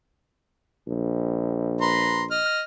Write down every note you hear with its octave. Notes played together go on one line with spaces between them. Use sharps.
A#1
B4 A#5 C6
D#5 F6